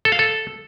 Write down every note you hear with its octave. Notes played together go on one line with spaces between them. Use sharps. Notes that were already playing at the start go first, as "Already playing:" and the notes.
A4
F5
A4